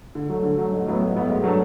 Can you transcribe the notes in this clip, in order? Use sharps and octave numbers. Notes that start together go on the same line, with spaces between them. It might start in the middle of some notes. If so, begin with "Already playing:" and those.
D3
F#3 A3
D3
F#3 A3
A1
A2 F#3 B3
A1
A2 F#3 B3
G#2
F#3 A3 D4 A4